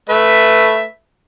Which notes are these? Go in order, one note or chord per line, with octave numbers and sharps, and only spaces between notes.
A3 B4 E5